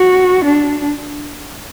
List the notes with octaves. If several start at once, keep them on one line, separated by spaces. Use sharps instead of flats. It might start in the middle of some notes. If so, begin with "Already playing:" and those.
Already playing: F#4
D4